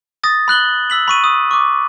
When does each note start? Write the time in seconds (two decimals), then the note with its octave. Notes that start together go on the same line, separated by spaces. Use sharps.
0.24 D#6 A6 A#6
0.48 B5 F#6 F#7 G7
0.90 E6 B6 F#7
1.08 B5 C#6 D#7
1.24 D#6
1.51 C#6 D6